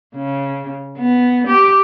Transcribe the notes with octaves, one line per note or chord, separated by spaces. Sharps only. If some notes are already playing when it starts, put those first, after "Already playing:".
C#3
B3
G4